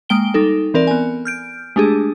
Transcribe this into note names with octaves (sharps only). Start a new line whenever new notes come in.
G#3 A#3 G5 D7 G7
G3 D#4 A4
E3 C4 A#4 D5
B3 G#5
F6 G6 D7
G#3 A3 D4 G4 G#4